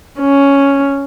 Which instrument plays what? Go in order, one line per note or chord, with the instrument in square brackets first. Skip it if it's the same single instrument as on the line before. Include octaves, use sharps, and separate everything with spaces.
[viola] C#4